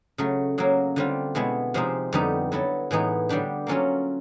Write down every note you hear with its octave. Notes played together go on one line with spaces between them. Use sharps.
C#3 F#3 A3
C#3 F#3 A#3
D3 G3 C4 F4
B2 G#3 B3 E4
C3 F3 G#3 C4 D#4
F2 D3 G3 B3 D#4
F#3 B3 E4 A4
A2 E3 G#3 B3 D#4
D3 G3 B3 D4 G4
F#3 A#3 C#4 F4 A4